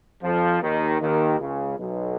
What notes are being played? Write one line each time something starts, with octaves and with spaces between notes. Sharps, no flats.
F2 F3
D#2 D#3
D#2 D#3
C#2 C#3
B1 B2